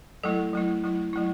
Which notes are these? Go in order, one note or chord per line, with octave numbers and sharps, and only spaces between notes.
F#3 A3 E4 A4
F#3 A3 E4
F#3 A3 E4
F#3 A3 E4